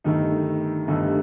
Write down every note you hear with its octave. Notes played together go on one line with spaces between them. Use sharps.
G1 G2 D#3 A3 D#4
G1 G2 D#3 A3 D#4